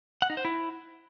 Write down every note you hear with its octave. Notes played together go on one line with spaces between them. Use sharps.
F#5
D#4
C5
E4